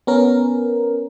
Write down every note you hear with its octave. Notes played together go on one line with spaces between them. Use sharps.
B3 C#4 A#4